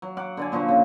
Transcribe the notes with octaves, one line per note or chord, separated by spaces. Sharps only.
F#3
F#5 D6
D3 D5 G#5
A#2 D3 F3 C#6
C#3